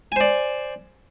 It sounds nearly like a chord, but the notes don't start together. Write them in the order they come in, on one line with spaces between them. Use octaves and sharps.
G#5 C5 D5